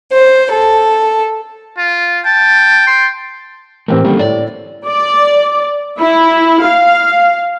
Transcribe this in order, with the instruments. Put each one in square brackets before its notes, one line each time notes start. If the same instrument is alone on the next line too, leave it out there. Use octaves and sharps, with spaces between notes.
[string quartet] C5
A4
[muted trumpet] F4
[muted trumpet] G5 [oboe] A5
[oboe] C6
[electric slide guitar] A2 E3 A3 [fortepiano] C4 G4 A#4
[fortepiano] D3 G3 [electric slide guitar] A#3 C#4
[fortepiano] A2 [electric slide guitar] D5
[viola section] D5
E4
F5